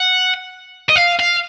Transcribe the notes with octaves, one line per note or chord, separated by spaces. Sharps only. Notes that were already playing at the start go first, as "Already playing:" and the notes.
Already playing: F#5
D#5
F5
F5